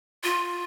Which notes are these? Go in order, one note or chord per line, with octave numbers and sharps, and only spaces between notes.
F4